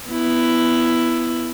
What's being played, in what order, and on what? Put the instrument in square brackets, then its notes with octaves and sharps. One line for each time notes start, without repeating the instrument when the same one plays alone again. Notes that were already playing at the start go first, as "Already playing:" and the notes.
[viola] B3 E4